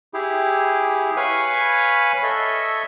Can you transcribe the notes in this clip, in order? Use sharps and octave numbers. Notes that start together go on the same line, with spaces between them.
E4 G4 G#4
B4 C#5 F5 G#5 B5
A4 C#5 D#5 E5